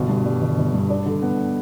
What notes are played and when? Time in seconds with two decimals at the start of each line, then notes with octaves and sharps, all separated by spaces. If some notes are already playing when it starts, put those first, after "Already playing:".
Already playing: G1 B2
0.09 G2
0.25 G3
0.42 G1
0.58 G1
0.74 G2
0.90 D4
1.06 D3
1.22 B3